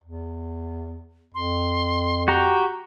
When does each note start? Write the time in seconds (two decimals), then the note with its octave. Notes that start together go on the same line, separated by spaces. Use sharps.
0.03 E2
1.34 F2 C6
2.28 F#4 G4 G5 A#5